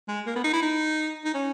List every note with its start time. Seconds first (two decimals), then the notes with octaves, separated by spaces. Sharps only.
0.08 G#3
0.26 A#3
0.36 B3
0.44 D#4
0.53 E4
0.62 D#4
1.25 D#4
1.34 C#4